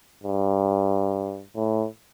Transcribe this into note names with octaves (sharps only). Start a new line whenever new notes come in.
G2
A2